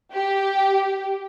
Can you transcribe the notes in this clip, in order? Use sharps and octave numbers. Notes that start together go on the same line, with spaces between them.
G4